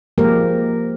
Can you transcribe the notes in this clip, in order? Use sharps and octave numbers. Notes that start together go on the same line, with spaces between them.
F3 G#3 A#3 G4 A#4